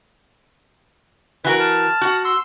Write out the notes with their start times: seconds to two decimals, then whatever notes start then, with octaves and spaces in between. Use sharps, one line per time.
1.44 E3 F#4 A#4 B4
1.60 A5 F6
2.01 F#4 F#5
2.25 C6 E6